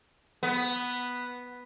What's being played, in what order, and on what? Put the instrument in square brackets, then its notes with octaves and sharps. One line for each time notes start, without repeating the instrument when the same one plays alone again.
[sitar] B3